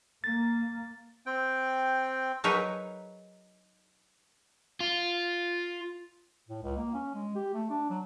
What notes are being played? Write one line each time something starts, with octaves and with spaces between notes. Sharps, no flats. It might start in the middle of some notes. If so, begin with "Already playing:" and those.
A#3 A6
C4 G5
F#3 D#4 G#4 A#4 B4 C#5
F4
A2
C#2
A#3
C#4
G#3
G4
A3
D4
F#3